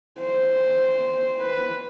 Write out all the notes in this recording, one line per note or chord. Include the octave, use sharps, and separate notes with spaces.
C5
B4